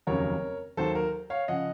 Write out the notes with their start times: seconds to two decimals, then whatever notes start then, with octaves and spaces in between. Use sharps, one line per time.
0.07 F1 D#2 C#3 F#3 A#4 C#5
0.77 D#2 D#3 F#3 A4 C5
0.95 A#4
1.30 C#5 F5
1.48 C#3 F3 D#5 F#5